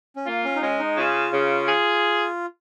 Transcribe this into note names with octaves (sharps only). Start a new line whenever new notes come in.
C#4
A#3 F4
C#4
D#4
G#3 C#4
D#4
C#3 F4
C#3
G#4